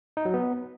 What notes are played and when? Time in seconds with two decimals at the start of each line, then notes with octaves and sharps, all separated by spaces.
0.17 D#4
0.25 F#3
0.34 B3